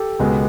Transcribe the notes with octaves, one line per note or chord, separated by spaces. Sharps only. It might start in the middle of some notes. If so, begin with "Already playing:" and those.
Already playing: G4 A4
C#2 B2 G#3 B3